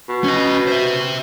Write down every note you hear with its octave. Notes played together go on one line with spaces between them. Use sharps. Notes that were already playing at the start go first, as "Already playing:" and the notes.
B2
C#4 D#5
C5 E5